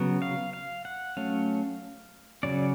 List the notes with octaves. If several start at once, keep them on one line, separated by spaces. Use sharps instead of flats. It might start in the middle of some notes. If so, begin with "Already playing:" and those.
Already playing: C#3 F#3 B3
F5
F5
F#5
F#3 A3 C#4 F5
C#3 F#3 C#4 D5